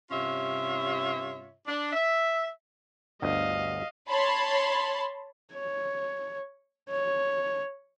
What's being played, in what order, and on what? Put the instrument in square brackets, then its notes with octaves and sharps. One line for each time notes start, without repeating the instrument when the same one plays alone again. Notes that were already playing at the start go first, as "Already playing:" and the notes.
[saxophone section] G2 C3 C#4 F4 C#5 E5
D4
E5
[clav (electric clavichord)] G1 D2 [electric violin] D#5 F5
[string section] C#5 A5 B5 C6
[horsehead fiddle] C#5
C#5